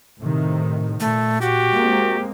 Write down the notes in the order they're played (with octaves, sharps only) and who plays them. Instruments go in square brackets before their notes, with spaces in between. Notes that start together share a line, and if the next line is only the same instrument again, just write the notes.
[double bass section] A2 C3 D#3
[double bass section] A#2 [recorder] A3
[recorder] F#4 [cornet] G4
[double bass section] G#3 A#3 C4